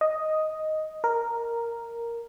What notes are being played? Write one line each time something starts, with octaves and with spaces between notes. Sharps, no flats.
D#5
A#4